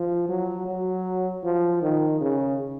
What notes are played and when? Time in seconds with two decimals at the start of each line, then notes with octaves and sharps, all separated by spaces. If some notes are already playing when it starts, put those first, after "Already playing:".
Already playing: F3
0.29 F#3
0.67 F#3
1.44 F3
1.82 D#3
2.21 C#3